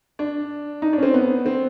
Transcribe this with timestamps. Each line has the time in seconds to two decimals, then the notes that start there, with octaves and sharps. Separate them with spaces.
0.19 D4
0.82 D#4
0.93 D4
0.98 C#4
1.03 C4
1.14 B3
1.46 C4